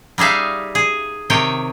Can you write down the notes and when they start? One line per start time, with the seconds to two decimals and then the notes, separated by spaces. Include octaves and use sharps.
0.18 G3 D#4 G#4 E5 F5
0.75 G#4
1.30 C3 D#3 C#5 G5